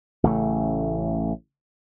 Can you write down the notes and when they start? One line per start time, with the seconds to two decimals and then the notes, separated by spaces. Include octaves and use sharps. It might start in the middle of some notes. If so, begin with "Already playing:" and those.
0.24 A1 C#3 A3